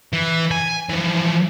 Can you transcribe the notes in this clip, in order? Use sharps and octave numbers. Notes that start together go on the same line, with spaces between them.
E3
G#5
E3 F3